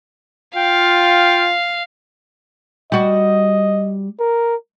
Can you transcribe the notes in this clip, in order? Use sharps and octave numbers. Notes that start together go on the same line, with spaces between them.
F4 F5 G5
G3 F#4 D#5
A#4